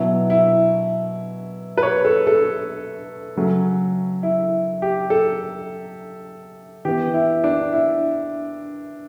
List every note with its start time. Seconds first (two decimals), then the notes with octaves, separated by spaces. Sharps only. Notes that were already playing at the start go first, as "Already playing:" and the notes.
Already playing: B2 F#3 B3 E4
0.30 E4
1.77 B4
1.83 C#5
2.05 A4
2.27 A4
3.36 C#3 F#3 A3 C#4
4.23 E4
4.82 G4
5.10 A4
6.85 E3 B3 G4
7.14 E4
7.44 D4
7.73 E4